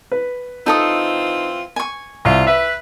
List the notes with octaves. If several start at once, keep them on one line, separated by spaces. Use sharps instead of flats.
B4
E3 C4 D#4 F4 A4 D#6
G#5 C#6
C2 F4
B4 E5